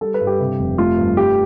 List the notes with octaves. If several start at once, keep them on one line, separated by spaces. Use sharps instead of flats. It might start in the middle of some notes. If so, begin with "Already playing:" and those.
G3 A4
B4
G2
G4
C3
F1
A3 F4
G2
G3 G4